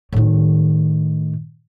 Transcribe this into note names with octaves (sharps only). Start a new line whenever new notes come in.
A2 D#3